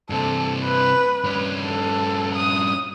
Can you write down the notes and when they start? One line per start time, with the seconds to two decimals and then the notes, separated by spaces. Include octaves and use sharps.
0.10 G2 C3 A4
0.65 B4
1.24 G2 C#4
1.66 A4
2.35 D#6